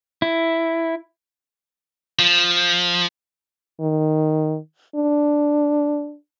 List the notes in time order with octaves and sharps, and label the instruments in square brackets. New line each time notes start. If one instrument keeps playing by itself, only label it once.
[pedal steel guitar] E4
[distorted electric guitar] F3
[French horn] D#3
D4